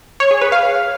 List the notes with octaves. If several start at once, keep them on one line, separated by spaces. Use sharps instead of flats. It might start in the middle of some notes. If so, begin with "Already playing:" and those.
C#5
G#4
B4
F5